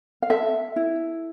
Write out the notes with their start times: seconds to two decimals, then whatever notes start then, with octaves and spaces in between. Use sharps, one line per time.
0.22 F5
0.30 A4 E5
0.76 E4